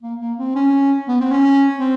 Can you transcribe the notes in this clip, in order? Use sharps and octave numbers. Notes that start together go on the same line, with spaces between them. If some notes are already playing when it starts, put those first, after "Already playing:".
A#3
A#3
C4
C#4
B3
C4
C#4
C4